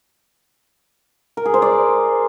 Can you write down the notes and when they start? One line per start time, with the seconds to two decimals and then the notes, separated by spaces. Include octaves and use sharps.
1.37 A#4
1.45 G#4
1.54 C5
1.62 D5